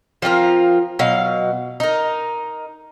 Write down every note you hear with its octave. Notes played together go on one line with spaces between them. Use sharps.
F3 C4 F4 A#4
B2 F#3 F5
D#4 A#4